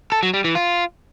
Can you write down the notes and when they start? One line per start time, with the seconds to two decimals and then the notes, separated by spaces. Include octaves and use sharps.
0.12 A4
0.23 F#3
0.34 G3
0.44 E3
0.55 F4